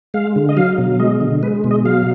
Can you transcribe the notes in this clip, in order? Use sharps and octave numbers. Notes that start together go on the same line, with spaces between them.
G#3 F5
D3
D#5
F#3 F5
B2
G#3 D#5
D3
G#3 B4
B2
D#5
F#3 F5